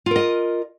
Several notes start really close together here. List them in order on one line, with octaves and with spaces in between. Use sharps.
F4 A#4 D#5